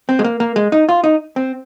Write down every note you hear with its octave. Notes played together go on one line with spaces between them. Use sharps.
C4
G#3
A#3
A#3
G#3
D#4
F4
D#4
C4